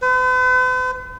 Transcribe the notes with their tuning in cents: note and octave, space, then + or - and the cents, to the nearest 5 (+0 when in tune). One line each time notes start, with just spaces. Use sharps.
B4 +45